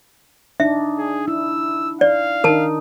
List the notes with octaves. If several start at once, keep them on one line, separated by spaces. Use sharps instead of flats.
D4 D#4 E5
G#4
E4 E6
D5 F5
D#3 D4 D#4 A#4 A5